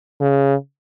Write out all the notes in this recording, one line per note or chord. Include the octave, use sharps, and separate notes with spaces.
C#3